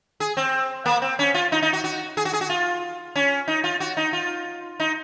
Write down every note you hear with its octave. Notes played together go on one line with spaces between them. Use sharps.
G#4
C4
A#3
C4
C#4
F4
D#4
D#4
F#4
F#4
G#4
F#4
G#4
F#4
F4
C#4
D#4
F4
F#4
D#4
F4
D#4